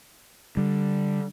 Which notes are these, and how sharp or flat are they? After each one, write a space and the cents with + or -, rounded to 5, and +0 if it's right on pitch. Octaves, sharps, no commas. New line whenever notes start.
D3 +0 G3 +0